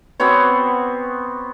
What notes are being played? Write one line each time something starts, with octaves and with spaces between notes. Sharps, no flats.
B3 C4 F#4 C#5